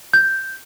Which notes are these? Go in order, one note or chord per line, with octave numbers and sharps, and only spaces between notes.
G6